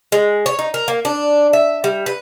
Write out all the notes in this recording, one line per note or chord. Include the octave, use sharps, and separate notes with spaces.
G#3
C#5
D#4
A#4
A#3
D4
E5
G3
B4